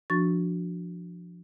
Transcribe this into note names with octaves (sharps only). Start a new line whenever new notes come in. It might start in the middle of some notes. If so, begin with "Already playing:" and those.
F3 D4 F#4 C#6 A6